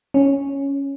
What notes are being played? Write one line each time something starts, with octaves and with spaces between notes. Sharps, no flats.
C#4